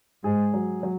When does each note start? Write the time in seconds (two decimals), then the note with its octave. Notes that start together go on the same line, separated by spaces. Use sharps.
0.23 G#2 G#4
0.54 F#3
0.83 F#3